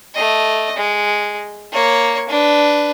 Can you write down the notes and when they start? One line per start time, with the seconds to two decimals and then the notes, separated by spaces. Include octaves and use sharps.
0.15 A3 D#5
0.77 G#3
1.73 A#3 C#5
2.29 D4 B4